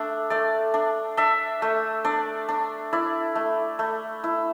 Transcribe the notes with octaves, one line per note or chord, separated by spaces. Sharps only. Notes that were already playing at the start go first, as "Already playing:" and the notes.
Already playing: A3 D4 E5
A3 D5
D4
D4 E5
A3
D4 D5
D4
E4 D5
A3
A3
E4